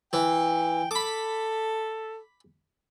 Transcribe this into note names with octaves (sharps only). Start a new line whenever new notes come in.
E3 G5
A4 B5 D6